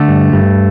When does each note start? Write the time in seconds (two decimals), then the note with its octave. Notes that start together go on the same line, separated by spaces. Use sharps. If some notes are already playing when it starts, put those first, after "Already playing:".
Already playing: D3 A3
0.08 G2
0.33 G2